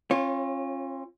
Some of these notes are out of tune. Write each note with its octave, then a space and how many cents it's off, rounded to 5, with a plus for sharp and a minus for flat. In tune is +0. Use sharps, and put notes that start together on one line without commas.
C#4 -45 F4 +0 C#5 -15